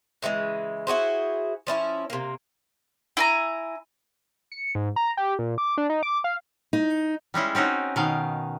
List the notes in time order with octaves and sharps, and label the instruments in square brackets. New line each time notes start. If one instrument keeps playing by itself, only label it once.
[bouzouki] C#3 E3 F#3 G#3
E4 F#4 G#4 C5
F3 C#4 E4 C#5
C3 A#3
[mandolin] E4 G#5 A#5
[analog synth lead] C#7
G#2
A#5
G4
A#2
D6
D4
D#4
D6
F5
[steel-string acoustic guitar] D#4
[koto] G3 G#3 C#4 E4
C4 C#4 D#4 F#4
B2 D#3 F5